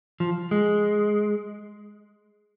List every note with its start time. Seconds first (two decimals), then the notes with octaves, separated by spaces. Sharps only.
0.20 F3
0.51 G#3